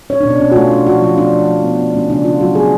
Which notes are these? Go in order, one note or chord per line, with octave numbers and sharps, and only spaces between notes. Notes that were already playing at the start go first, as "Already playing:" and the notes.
C#4 C#5
D4
B2
D4
B2 C#4
F#4
A3 F4
C#4 D4
F3 F#4
F3 F4
A3 D4
F3
F3
B3
B3
A3 C#4
C#3 D4
C#4 F4
F#3 F#4
B3 G#4